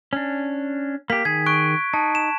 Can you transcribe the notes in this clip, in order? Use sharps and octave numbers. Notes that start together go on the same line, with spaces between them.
C#4 D4
A#3 G4 B6
D#3 G#4 G#6
C#6 F#6 D7
D#4 A5
E7